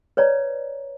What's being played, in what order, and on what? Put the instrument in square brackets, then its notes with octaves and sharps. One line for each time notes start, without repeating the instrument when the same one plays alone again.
[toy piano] B4 C#5 D5 A#5